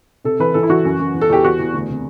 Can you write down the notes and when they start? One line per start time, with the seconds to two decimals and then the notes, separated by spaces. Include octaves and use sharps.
0.24 C3 A4
0.40 E3 B4
0.54 E3 A4
0.63 E4
0.69 E3 F#4
0.85 F#2
0.99 F#2
1.14 E2
1.21 A4
1.30 E2 G4
1.44 E2 F#4
1.60 E2
1.73 D2
1.89 C3